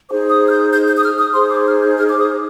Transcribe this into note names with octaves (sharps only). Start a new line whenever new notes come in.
D#4 G#4 C5 D6
D#6
F6
G6
G6
G6
D#6
F6
D#6
D#4 G#4 C5 C6
D6
F6
G6
F6
D6
D#6